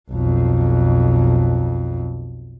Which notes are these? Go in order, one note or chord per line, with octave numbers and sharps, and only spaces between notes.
B1 F2